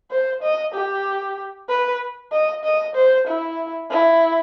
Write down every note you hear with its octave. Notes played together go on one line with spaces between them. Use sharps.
C5
D#5
G4
B4
D#5
D#5
C5
E4
E4